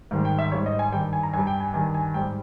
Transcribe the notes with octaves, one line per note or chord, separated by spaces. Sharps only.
G#2 D#3 G3
G5
E5
G#2 G3 C#5
D#5
G#5
G2 D#3 G3 G5
G#5
A#5
G2 G3 G#5
G5
G#5
G2 D#3 G3 G#5
G#5
G#2 G3 G5